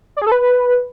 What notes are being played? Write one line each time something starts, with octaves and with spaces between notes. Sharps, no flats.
D5
G#4
A4
B4